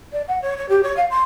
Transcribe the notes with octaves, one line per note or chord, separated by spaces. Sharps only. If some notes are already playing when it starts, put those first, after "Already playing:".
D5
F#5
C#5
C#5
G4
C#5
F5
C6